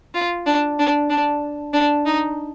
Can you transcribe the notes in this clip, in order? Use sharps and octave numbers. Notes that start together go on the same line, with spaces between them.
F4
D4
D4
D4
D4
D#4